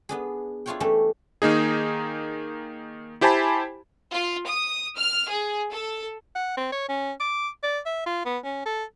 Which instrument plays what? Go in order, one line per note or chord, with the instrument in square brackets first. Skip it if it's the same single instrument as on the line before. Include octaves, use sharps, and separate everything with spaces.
[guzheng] B3 D4 G#4
D4 E4 F4 C#5 D5 G5
E3 A3 C#4 D4 G4 A4
[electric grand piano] D#3 A#3 D#4 G#4
E4 G4 C5 G#5 A5 B5
[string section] F4
D#6
F6
G#4
A4
[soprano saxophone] F#5
C4
C#5
C#4
D6
D5
E5
F4
B3
C#4
A4